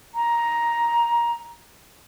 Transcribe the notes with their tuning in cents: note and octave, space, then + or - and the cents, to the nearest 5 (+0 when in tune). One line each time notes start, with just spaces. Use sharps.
A#5 +10